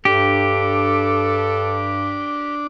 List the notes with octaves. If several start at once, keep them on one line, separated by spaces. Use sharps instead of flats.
G2 D4 G4 A4